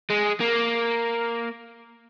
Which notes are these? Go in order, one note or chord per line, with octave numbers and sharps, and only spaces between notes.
G#3
A#3